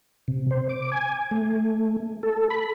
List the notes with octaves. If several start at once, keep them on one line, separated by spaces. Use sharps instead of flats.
C3
C5
D6
G#5
A3
A4
B5